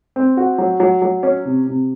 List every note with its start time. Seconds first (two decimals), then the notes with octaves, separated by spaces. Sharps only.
0.16 C4
0.37 F#4
0.58 F#3
0.80 F#3
1.02 F#3
1.23 C#4
1.45 C3
1.67 C3